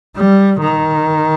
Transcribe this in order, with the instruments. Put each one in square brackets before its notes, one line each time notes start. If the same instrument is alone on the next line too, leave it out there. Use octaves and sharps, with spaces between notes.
[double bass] G3
D#3